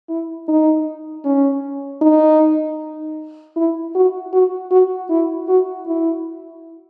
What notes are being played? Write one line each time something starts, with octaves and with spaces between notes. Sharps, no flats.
E4
D#4
C#4
D#4
E4
F#4
F#4
F#4
E4
F#4
E4